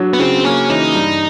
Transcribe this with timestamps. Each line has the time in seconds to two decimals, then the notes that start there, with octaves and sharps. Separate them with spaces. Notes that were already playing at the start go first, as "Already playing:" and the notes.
Already playing: F#3 D4
0.13 B3
0.19 C#3 C4
0.44 A#3 C#4
0.70 E3 D#4
0.94 G2